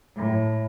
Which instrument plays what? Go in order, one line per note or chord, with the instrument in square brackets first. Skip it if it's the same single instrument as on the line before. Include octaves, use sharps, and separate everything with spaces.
[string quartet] A2